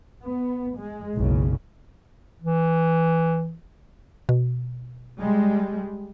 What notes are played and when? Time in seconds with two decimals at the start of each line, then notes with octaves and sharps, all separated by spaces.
0.21 B3
0.76 G#3
1.16 F#1 B1 C#3
2.42 E3
4.29 B2
5.19 G3 G#3